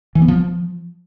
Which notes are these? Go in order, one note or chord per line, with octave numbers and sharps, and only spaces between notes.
E3
B3
F3